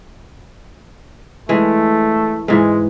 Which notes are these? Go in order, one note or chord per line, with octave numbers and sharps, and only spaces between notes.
E3 G#3 A3
G#2 E3 G#3